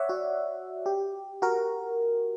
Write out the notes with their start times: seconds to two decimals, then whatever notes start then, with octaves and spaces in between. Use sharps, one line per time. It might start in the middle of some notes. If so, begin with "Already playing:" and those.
Already playing: C#5 D5 E5 F#5
0.09 F#4
0.86 G4
1.42 F#4 A#4